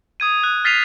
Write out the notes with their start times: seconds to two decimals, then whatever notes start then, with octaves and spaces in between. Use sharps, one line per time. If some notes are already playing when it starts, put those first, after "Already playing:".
0.20 D#6 G#6 D#7
0.44 F#6
0.64 F6 A6 B6 C7 D#7 F7